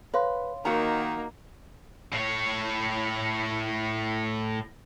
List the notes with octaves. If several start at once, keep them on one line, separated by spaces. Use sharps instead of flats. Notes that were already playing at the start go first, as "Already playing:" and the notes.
B4 C#5 F5 C6
D#3 A#3 D#4 F#4 F#5 A#5
A2 C#5